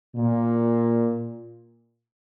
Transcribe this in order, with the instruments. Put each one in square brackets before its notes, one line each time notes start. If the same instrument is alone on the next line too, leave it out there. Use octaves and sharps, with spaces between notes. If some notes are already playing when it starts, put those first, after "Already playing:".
[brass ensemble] A#2